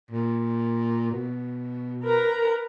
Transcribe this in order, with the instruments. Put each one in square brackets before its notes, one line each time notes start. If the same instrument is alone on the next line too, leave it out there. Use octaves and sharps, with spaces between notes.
[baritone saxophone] A#2
B2
[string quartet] A#4 B4 A#5